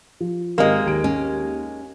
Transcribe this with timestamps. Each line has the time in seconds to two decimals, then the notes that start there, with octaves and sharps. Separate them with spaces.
0.21 F3
0.58 G#1 G#3 A#3 G4 D#5
0.86 D#2 D7
1.04 C#4